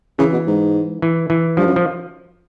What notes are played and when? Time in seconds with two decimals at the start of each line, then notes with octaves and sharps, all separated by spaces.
0.19 C#3 E3
0.33 B2
0.47 G#2
1.02 E3
1.30 E3
1.57 G2 F3
1.66 F#2
1.76 F3